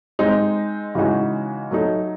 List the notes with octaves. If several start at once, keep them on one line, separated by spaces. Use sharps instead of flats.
G#3 C4 D#4
C#3 E3 G#3 D#4 F#4
F#3 A3 D#4